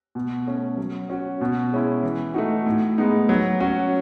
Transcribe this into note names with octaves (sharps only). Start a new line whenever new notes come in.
B2
A3 C#4
F#3
C#4 F#4
B2
G#3 C#4 E4
E3
A3 D#4 F#4
A2
G#3 B3 D#4
F#3
C#4 F#4